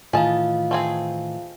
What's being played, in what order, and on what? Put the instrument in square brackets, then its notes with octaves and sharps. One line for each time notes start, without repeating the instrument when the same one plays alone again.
[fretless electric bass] A2 D#3 E3 [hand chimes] F4 D#5 F5 [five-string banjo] G#4 A5
[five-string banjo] A3 C4 G#4